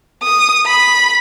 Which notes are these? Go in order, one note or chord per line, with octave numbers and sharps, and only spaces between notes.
D#6
B5